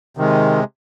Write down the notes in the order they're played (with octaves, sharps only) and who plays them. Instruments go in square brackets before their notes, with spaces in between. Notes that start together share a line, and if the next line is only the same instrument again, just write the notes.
[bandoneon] C3 D#3 G#3